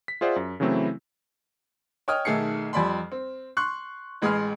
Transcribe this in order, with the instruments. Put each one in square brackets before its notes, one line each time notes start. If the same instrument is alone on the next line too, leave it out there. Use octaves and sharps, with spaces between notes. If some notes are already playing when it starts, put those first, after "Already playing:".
[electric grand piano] B6
F4 G#4 C5 D5 E5 F#5
F#2
C#3 E3 F#3 A3 C4 E4
[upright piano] C#5 D#5 G5 D#6 F6
B1 D#3 A3 G#4 C7 C#7
F2 G3 D5 B5 C6
C4
C6 C#6 F#6
A1 G#3 G#4 B5 C6 F6